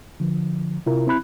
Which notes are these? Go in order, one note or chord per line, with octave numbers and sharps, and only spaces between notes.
D3 F3
C3 E4 F4 A#4
C4 E4 B5 F#6